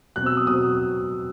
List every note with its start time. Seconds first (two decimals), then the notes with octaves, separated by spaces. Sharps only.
0.16 B2 F#3 C4 F#6
0.26 E6
0.37 D#6
0.47 B2 F#3 C4 D#6